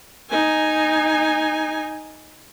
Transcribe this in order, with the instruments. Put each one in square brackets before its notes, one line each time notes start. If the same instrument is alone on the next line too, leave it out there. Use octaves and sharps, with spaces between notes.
[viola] D#4 G#5